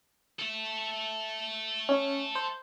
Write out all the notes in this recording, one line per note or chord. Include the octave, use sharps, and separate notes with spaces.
A4 E5
C#4
C5